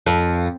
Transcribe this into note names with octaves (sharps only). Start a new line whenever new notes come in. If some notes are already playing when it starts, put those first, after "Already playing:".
F2